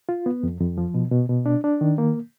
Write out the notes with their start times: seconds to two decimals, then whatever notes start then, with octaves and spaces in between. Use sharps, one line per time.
0.09 F4
0.26 B3
0.43 F2
0.60 F2
0.78 F3
0.94 B2
1.11 B2
1.29 B2
1.46 D4
1.64 D4
1.81 D#3
1.98 A#3